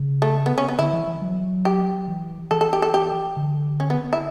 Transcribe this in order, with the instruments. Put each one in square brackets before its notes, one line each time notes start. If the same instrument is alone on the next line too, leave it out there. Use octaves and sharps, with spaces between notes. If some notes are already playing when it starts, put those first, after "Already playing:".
Already playing: [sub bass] C#3
[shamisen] A3
B3
C#4
B3
[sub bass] D3 [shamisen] E4
[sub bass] E3
E3
F#3
[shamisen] G4
[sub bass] E3
[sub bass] E3 [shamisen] A4
[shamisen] A4
G4
A4
G4
[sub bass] D3
[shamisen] C#4
B3
E4